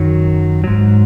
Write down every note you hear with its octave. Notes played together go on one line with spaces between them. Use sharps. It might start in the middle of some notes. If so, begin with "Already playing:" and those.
Already playing: F#2 D#3 F#3 F#4
G#2 F#3